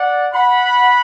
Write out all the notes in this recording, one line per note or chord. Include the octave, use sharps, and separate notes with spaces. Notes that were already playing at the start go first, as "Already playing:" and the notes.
Already playing: D5 F#5
F#5 B5